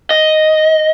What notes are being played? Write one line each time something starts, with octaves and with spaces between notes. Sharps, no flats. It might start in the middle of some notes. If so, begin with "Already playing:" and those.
D#5